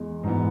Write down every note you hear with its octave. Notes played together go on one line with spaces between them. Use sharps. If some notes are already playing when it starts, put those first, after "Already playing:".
Already playing: E2 G#3
G#2 E3 B3